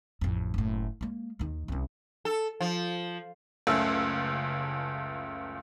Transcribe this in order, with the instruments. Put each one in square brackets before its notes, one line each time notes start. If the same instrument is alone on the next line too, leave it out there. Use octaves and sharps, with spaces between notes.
[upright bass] A1 F2
F#1 A2
G#3 A#3
D#2 D#3
C2 C#4
[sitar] A4
F3
[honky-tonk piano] F#1 C#2 A3 C#4 E6